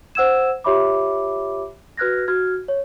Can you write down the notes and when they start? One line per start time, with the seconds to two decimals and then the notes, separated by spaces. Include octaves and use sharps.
0.15 C5 F#5 E6 G#6 E7
0.64 F4 G4 C#5 E5 B5 D6
1.97 F#4 B4 F6 F#6 G#6 A#6
2.28 F#4 F6 G#6
2.68 C#5